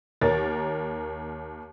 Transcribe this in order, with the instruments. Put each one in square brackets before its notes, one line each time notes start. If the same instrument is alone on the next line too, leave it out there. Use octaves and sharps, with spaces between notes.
[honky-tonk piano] D#2 A#4 C#5 A6